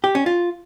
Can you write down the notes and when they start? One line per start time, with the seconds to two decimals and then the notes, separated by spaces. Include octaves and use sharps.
0.04 G4
0.15 C#4
0.26 F4